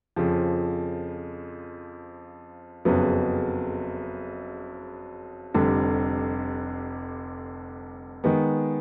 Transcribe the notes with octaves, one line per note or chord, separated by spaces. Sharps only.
F2 C#3 F3
F#1 F2 C#3 F#3 B3
F1 F2 D3 G3
D#3 G#3 B3